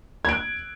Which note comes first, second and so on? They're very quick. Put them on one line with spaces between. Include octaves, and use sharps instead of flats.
G#6 D7 F#6